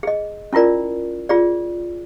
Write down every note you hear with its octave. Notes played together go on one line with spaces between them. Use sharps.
G#4 D#5
C#4 E4 F4 A#4 D5
F4 G#4 D5